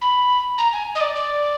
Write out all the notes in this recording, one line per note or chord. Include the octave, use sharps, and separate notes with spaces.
B5
A#5
G#5
D#5
D5
D5